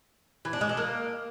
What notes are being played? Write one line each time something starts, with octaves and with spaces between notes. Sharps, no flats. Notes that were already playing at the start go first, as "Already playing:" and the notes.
E3
D4
G#3
A4
A#3